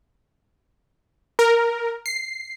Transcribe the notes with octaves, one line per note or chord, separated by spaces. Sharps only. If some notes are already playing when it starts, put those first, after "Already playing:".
A#4
C7